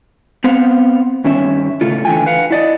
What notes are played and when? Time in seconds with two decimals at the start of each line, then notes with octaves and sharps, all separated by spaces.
0.44 B3 C4 C5 F5 F#5
1.24 G2 D#3 C#4 E5
1.81 A2 C#3 A3 F4
2.05 D3 E3 A3 G5 G#5
2.26 B4 F5 F#5
2.51 E4 D5 D#5